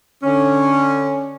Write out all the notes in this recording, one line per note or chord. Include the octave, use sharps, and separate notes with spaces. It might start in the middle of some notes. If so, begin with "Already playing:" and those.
D3 C#4